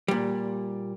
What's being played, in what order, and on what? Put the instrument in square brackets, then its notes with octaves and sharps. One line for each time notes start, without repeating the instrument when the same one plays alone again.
[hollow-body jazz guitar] A#2 G3